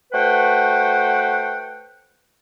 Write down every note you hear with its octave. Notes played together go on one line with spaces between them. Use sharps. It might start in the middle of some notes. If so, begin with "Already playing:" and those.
A3 F#4 B4 C5 F#5 G5